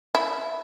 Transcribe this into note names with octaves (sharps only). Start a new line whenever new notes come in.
E4